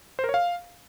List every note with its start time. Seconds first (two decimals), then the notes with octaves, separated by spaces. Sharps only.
0.19 C5
0.24 A#4
0.29 C#5
0.34 F5